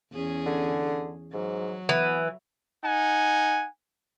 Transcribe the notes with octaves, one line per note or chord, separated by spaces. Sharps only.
E2 C#4 G#4
D3
G#2 F#3
E3 B3
D#4 F#5 G#5